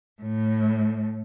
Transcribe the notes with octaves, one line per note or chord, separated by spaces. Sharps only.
A2